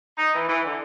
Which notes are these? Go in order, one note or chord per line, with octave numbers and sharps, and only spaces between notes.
D#4
E3
E3
D3